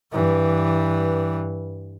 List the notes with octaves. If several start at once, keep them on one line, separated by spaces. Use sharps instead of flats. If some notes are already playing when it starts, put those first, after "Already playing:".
G2 E3